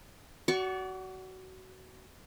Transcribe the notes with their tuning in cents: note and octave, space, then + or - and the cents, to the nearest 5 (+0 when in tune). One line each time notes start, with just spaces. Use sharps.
F#4 +20 D5 -30 C#6 +0